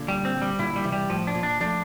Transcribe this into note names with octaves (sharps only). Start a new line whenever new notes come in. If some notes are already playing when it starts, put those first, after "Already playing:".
Already playing: A#2 D3
G3
C4
G3
A#2 D3 E4
G3
C3 E3
G3
A2 F3
D4
A#2
D4
F3 A3 D4